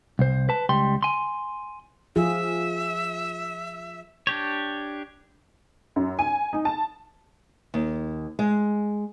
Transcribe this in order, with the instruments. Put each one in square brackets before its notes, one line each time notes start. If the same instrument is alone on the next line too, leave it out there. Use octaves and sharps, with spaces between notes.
[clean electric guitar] C2 C5
B4 A5
C#2 G3 G5 C6
G#5 C6
[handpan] F3 F4 G#4 [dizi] E5
[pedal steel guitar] D4 G4 C#5
[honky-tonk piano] F#2
G#5
D#4
A5
[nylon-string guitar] D#2
G#3